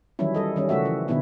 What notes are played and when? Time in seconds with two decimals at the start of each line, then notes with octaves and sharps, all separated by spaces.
0.19 D#3 E3 F#3 G3 C#4 E4
0.34 G3 A4 D#5
0.56 D#3 G3 C#4
0.69 C#3 F3 A3 F#4 E5
0.85 E3
1.08 B2 D3 D#3 B3 E4